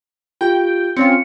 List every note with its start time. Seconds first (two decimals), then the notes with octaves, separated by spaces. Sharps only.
0.41 F4 G4 G5
0.97 C4 C#4 F4 C#7